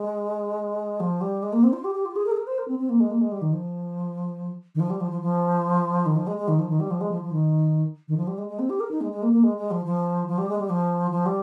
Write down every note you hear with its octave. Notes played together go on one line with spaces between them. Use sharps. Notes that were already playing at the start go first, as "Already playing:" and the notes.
Already playing: G#3
F3
G3
G#3
A#3
C4
F4
G4
G4
F4
G#4
A#4
G#4
A#4
C5
A#4
C4
C4
A#3
G#3
A#3
G#3
G3
D#3
F3
D#3
F3
G3
F3
F3
F3
D#3
F3
G#3
G#3
D#3
F3
D#3
G3
F3
G#3
F3
F3
D#3
D#3
F3
G3
G#3
G#3
C4
G4
A#4
D#4
G#3
G#3
A#3
A#3
G#3
G#3
F3
F3
F3
G3
G#3
G3
F3
F3
G3